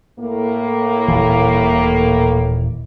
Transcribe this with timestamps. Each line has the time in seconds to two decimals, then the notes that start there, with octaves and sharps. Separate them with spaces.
0.19 A2 A#3
1.08 D#1 A#2 E3